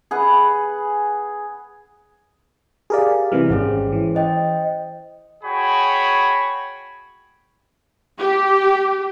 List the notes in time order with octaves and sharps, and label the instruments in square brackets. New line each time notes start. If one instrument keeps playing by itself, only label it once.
[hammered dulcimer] G#4 B4 F#5
[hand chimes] G4 F5 [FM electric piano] G#4 A#4 D5
[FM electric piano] C3 E3 G3 [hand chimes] F6
[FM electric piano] G#1 [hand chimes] C#4 G#4 C5
[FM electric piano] E3
[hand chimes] C5 D#5 G5
[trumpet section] F#4 G#4 C#5 G5 G#5 B5
[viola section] G4